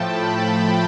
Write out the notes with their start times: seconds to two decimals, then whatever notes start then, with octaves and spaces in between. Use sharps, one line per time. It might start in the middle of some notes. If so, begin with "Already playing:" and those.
Already playing: A2 F3 A3 G5 A5
0.11 B5